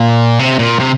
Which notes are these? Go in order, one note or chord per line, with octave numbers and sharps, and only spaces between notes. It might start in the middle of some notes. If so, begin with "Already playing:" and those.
Already playing: A#2
C3
A#2
C3